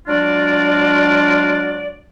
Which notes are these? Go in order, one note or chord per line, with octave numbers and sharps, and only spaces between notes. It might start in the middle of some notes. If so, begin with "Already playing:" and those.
F#3 G#3 D4 F4 F#4 D5